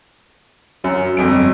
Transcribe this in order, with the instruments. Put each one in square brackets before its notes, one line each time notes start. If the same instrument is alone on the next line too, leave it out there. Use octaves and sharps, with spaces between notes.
[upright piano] F#2 [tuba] F#3
[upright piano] G1 F2 D7 [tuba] F#3